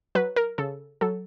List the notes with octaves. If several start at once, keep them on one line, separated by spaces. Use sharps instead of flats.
F#3 B4
A#4
C#3 A4
F#3 A4